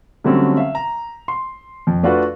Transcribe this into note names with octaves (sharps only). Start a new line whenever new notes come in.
D3 F#3 G3 A3 C4 C#4
E5 F5
A#5
C6
F2
A3 D4 F4 F#4 B4